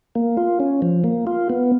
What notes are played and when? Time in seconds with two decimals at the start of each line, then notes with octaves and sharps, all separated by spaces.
0.15 A#3
0.37 F4
0.60 C#4
0.82 F3
1.04 A#3
1.27 F4
1.50 B3